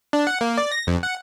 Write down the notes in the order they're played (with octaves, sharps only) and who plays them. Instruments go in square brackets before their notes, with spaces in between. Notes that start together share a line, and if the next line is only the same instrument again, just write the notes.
[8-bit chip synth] D4
F#5
A#3
D5
A#6
F2
F#5